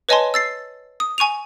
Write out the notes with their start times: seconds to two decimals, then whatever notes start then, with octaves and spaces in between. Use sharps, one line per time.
0.09 B4 C#5 D#5 G#5 A5 C6
0.34 E6 A6 C7
1.00 D#6
1.18 G#5 C#6 D#7 F7